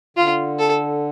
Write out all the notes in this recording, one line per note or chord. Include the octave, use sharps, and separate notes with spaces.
D3 F4
A4